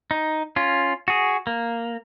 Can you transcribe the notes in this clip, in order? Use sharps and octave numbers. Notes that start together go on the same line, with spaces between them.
D#4
C#4 F4
F#4 G#4
A#3